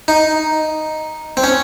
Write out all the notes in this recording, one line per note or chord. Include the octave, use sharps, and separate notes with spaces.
D#4
C4
C#4